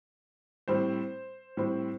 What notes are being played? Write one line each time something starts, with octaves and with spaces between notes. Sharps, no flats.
A2 G3 C4 C5
A2 G3 C4